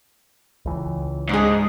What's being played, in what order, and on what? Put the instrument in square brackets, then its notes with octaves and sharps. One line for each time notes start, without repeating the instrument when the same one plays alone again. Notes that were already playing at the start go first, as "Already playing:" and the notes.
[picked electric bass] C#2 E3
[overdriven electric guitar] G#2 [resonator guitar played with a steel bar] D4 G#4